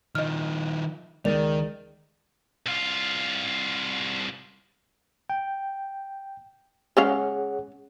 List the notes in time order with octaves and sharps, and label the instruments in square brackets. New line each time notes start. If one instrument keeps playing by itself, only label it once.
[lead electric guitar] D#3 F3 [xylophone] D#5 F6
[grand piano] C#2 A6 D#7 [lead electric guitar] D#3 [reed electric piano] A#4 D5 [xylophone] F7
[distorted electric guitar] C2 F4
[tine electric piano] G5
[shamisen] G#3 C#4 F5 [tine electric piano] G#4 C#5 F#5